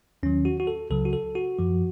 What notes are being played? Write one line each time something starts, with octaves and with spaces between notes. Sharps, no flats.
D#2 D#3 F#3 C#4
F#4
F#4
A4
C#2 C#3 F#3 A4
F#4
A4
F#4
F#2 F3